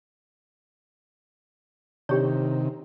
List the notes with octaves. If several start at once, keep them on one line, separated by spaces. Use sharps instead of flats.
C3 D#3 D4 G4 C#5